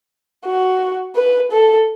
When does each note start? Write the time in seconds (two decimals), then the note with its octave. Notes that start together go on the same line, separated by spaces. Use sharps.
0.45 F#4
1.15 B4
1.51 A4